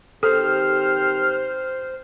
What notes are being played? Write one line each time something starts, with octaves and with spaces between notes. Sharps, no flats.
D#3 C4 G4 A4 C5 F6